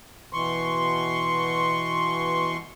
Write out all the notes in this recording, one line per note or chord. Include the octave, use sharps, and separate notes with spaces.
B2 E3 C6 C#6